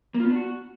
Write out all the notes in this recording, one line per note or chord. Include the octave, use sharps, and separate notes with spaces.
A#3
F4
B3
D4
F#4